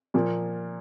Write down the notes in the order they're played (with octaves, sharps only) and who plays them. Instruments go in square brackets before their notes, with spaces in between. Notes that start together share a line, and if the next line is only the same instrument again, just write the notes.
[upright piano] A#2 F3 A#3